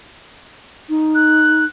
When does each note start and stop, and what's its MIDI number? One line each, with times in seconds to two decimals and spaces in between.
0.89 1.65 63
1.15 1.65 90